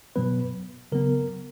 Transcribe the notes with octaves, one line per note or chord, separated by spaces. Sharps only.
B2 F#3 B3 B4
C#3 F#3 B3 A#4